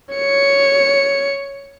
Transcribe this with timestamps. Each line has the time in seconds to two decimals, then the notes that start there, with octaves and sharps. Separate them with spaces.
0.15 C#5 C#7